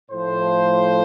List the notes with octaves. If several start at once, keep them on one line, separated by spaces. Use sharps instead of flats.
A2 F3 C5